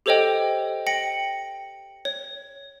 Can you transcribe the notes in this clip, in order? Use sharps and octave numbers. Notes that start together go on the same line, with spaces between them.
G4 A4 C5 C#5 D#5 G5
G5 A#6 C#7 F#7
C#5